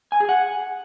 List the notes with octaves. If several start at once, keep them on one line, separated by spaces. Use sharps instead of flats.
G#5
G#4
F#5